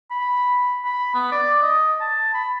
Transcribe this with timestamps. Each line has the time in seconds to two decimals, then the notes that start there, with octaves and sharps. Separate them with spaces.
0.11 B5
0.85 B5
1.14 B3
1.32 D5
1.62 D#5
2.01 A5
2.34 B5